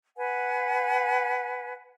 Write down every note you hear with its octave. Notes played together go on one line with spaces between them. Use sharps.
B4 F#5 G#5